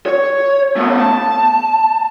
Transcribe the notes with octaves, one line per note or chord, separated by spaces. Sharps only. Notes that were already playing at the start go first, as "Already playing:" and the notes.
C#5
A3 B3
A5